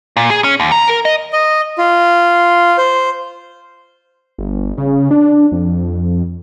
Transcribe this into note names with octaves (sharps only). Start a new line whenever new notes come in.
A#2
G#4
C#4
D#2
A#5
A#4
D#5
D#5
F4
C5
G1
C#3
D4
F2